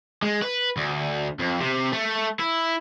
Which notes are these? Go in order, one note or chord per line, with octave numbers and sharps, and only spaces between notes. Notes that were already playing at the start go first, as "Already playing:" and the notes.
G#3
B4
D2
F2
C3
A3
E4